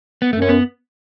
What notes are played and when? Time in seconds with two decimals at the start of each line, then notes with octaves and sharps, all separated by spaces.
0.22 B3
0.33 F#2 A3
0.42 C#4
0.49 B3